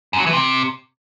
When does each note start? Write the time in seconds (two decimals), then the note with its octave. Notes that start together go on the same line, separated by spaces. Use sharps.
0.13 F#2
0.20 F#3
0.26 E3
0.33 C3